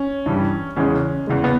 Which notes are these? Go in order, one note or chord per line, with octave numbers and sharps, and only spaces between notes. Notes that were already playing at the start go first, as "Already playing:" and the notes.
Already playing: C#4
G2 E3 G3
E2 C#3 E3 G#3 C#4
E2 C#3 E3 G#3
B3